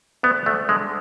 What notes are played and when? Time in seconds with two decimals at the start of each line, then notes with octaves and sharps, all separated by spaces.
0.23 D2 B3
0.46 D2 A3
0.69 D3 G#3